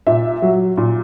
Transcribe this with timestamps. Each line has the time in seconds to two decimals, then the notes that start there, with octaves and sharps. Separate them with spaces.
0.07 A#2 E5
0.42 F#3
0.77 A#2